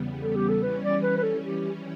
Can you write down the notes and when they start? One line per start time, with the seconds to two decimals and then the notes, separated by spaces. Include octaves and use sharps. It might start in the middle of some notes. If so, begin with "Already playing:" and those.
Already playing: E2 C#3 G3 B3
0.22 A4
0.36 G4
0.49 A4
0.63 E3 G3 C#4 B4
0.83 D5
1.03 B4
1.17 B4
1.23 A4
1.43 G4